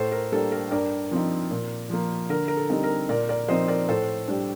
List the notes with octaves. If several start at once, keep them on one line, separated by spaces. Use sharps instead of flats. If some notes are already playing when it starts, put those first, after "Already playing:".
Already playing: A2 A4 C5
A#4
G3 A#3 D4 A4
A#4
G2 A#4 D5
F3 C4 D#4
A#2
F3 A#3
D3 A#4
A#4
A4
G3 C4 D#4
A#4
A#2 A#4 D5
A#4 D5
F3 C4 D#4 C5 D#5
A#4 D5
A2 A4 C5
G3 D4